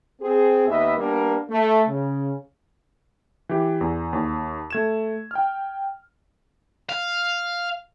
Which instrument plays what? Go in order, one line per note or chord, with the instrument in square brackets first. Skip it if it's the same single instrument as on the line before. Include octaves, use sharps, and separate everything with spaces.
[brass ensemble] C4 G#4
D#2 B3 B4 D#5 E5
G3 A#3 B3 D4 A#4
A3
C#3
[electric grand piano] E3 G4
E2
D#2
A3 G#6 E7
G5 F6
[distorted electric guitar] F5